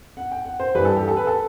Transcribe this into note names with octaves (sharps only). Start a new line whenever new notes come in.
F#5
G5
F#5
C5
G2 E3 G3 B4
A4
G4
A4
B4
A4